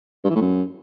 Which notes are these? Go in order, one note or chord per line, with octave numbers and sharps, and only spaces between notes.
G2
E3
A2
F#2